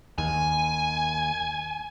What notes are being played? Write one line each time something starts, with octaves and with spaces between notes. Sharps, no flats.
D#2 G#5